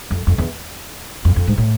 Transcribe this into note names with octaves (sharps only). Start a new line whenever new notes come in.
F2
F2
E2
F2
F2
G#2
A2